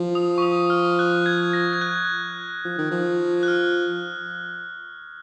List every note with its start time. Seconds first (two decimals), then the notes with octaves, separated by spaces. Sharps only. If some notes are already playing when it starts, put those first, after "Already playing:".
Already playing: F3
0.15 D#6
0.38 C#6
0.42 D#6
0.70 F6
0.99 F#6
1.26 G#6
1.53 A#6
1.73 G#6
1.81 F#6
2.65 F3
2.78 D#3
2.91 F3
3.43 F#6
3.48 F6